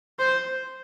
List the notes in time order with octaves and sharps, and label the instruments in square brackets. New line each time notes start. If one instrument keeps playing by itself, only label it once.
[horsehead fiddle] C5